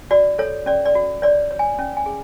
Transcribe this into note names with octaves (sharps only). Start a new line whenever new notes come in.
F#4 D5
A4 C#5
C#4 D5
D5
F#4
C#5 D5
C#5
G#5
C#4
G#5
G#4